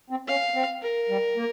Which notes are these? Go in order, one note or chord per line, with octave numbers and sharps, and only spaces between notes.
C4
C#4 F5
C4
A#4
G3
A#3